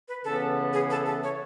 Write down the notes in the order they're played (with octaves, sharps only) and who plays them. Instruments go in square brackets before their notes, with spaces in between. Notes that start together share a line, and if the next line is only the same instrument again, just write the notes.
[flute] B4
[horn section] C#3 E3 B3 [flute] A4
[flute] G#4
A4
A4
C#5